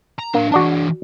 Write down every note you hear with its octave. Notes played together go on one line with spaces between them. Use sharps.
A#5
A#3 D4 F5
E3 D4 F#4 D5 A5